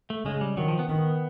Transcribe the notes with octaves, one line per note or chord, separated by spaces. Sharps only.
A3
C#3 G#3
G3
D#3 F#3
F3
B3
D#3 B3